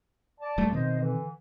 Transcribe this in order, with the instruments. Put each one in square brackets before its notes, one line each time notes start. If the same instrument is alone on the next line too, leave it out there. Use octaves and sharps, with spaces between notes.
[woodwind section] D5 A5
[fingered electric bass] D#1 G3 A3
[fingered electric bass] B2 D#3 C4 [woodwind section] C5 D#5
[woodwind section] D3 E3